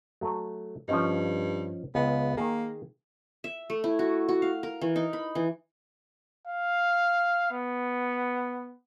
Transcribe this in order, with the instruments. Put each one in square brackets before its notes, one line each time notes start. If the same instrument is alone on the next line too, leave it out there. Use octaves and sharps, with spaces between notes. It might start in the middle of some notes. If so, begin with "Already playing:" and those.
[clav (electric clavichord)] F#3 A3
[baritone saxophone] G2 [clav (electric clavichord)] F3 C#4 D#4
[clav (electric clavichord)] C#2 [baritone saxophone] B3
[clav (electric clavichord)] D#3 G#4 [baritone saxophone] A#3
[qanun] E5
A3
E4
F#4
F#4
F5
A#4
E3
D#4
B5
E3
[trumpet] F5
B3